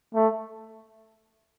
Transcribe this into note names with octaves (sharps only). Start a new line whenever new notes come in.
A3